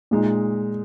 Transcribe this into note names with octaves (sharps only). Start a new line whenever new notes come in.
A#2 G#3 D#4